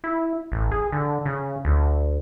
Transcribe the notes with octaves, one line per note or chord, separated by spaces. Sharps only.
E4
A1
G#4
D3
C#3
D2